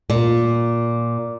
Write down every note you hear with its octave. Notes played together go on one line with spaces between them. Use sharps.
A#2